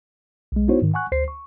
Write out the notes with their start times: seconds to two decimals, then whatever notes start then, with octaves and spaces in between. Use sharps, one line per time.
0.52 B1 G#3
0.68 B3 D#4 E4 F#4 C5 C#5
0.82 G#2 D#3
0.94 F#5 G#5 C#6 F#6
1.12 D2 C5 C7
1.28 C#6